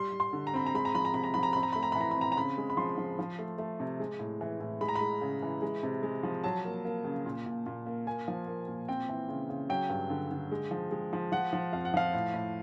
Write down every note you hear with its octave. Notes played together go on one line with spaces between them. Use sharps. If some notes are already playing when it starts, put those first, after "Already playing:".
Already playing: G3 C6
G3
C6
D3
A#5
C4 B5
A#5
G#3 B5
A#5
F3 B5
A#5
C3 B5
A#5
F3 B5
A#5
C4 B5
A#5
A3 B5
A#5
E3 B5
A#5
B5
C4 A#5
A#5
C#3 B5
G#3
B5
F3 C6
F3
F3
A3
A3
C3
G#3
A2
E3
A2
G#3 B5
A#5
B5
G#3
C#3
E3
G#3
C3
G#3
F3
F#3 A5
A#3
A#3
C#3
A#2
A#2
A#2
A#3
A#3 G#5
F3
A#3
A#2
C4 G5
E3
C#3
C#3
F#3 G5
G2
D3
D3
G#3
F3
G#3
F3
F3 F#5
F3
F2 F5
F#5
F3 F5
A2
A2